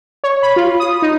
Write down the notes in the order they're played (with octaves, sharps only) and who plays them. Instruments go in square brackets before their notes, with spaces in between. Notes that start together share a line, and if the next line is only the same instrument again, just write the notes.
[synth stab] C#5
B5
F4
D#6
D#4